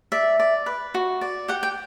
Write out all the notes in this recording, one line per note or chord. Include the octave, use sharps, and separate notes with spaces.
D5 E5
D5
B4
F#4
D5
G4 F#5
G5